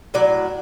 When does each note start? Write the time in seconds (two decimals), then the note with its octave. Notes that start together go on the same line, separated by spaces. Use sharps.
0.14 A2 F#3 D5